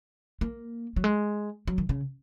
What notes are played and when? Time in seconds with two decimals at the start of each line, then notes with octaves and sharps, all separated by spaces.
0.41 A#3
0.96 F#3
1.04 G#3
1.67 F#3
1.78 D#3
1.89 C#3